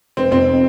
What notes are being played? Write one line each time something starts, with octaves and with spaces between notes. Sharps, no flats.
F1 C4
F2 C4